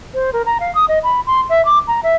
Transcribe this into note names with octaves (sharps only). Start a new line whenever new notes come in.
C5
A#4
A#5
F5
D#6
D#5
B5
C6
E5
D6
A#5
E5